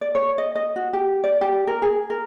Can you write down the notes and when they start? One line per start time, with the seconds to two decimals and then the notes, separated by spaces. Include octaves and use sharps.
0.01 D5
0.15 C#5
0.38 D#5
0.55 D#5
0.76 F#4
0.93 G4
1.24 D5
1.41 G4
1.67 A#4
1.82 G#4
2.10 A#4